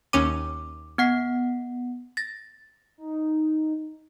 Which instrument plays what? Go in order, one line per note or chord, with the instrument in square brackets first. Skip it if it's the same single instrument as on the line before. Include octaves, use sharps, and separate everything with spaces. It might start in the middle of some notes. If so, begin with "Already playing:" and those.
[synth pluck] D#2 C#4 D#7 [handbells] D6
[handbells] B3 F#5 C7
A6 A#6
[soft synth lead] D#4